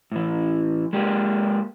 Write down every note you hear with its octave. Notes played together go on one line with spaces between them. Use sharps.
A2 E3
G#3 A#3 G4